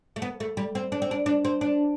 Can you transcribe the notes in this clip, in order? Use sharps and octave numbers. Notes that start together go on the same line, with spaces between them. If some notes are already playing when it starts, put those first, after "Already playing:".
A3
B3
A3
G3
C4
D4
C4
D4
D4
C4
D4